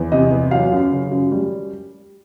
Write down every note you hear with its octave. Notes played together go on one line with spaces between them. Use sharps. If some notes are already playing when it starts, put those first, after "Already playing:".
Already playing: E2
C3 D#5
E2
F#3 F5
F#2
C#3
F#2
G3